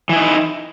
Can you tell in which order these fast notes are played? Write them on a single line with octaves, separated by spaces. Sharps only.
E3 E4 D#4